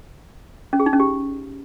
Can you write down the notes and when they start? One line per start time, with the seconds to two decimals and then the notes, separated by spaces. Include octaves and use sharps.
0.73 C#4
0.80 G#4
0.86 D#4
0.93 C#4
1.00 G4